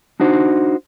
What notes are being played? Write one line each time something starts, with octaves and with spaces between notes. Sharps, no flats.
D4 D#4 F#4 C5